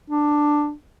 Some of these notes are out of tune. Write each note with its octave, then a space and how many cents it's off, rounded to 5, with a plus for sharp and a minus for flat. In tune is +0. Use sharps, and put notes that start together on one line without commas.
D4 +10